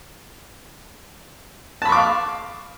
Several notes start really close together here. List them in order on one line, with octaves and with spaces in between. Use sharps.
A5 B5 C#6 D6 F5